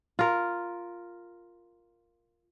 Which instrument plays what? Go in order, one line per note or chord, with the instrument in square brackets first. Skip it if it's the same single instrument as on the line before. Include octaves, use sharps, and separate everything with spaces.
[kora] F4 A#4